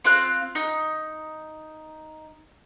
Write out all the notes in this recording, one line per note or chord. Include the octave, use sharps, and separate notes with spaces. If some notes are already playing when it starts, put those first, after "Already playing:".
C4 F4 F#6
D#4